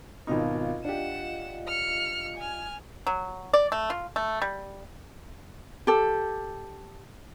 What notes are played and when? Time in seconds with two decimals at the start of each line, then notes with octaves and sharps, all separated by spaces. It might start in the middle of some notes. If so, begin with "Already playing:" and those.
0.27 G#1 B2 D#4 F4 D#5 F5
0.85 D4 G4 F#5 E7
1.67 F6 C#7
2.37 G#5 F6
3.07 F#3
3.53 D5
3.72 A3
3.90 F4
4.16 A3
4.42 G3
5.87 G4 A4